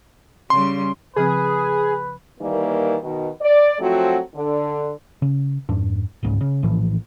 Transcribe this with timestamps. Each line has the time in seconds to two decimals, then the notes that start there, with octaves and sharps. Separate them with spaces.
0.50 C#3 G3 C6
1.16 C#3 F3 C4 G#4 B4
2.40 D#3 E3 G3 A#3
3.02 B2 D#3
3.40 D5
3.79 F3 F#3 A3 C4 F#4
4.35 D3
5.22 C#3
5.69 F2 G#2 D4
6.23 G1 C#2 G#2 C#3
6.41 C#3
6.62 A#1 A2 E3 F3